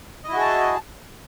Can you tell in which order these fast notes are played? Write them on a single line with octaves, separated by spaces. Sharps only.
D#5 E4 F#4 G#4 A5